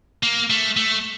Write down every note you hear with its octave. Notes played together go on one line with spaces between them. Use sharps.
A#3
A3
A3